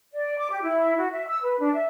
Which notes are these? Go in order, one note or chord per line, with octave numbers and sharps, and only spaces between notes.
D5
D6
G4
E4
F#4
E5
E6
B4
D4
E5